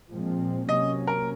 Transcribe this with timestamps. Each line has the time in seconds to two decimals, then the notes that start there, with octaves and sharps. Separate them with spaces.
0.11 A#2 F3 G#3 C4
0.68 C3 F#3 A#3 C#4 D#5
1.07 A#4